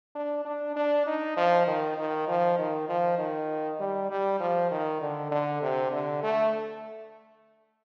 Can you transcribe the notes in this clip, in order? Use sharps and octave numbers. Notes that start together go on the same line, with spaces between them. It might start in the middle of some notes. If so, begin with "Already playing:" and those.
D4
D4
D4
D#4
F3
D#3
D#3
F3
D#3
F3
D#3
G3
G3
F3
D#3
D3
D3
C3
D3
A3